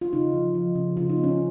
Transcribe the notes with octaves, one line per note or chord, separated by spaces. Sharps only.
F4
C#3 D#4
F3
F3
C#3
C#3 F4
D#4
B3
C#4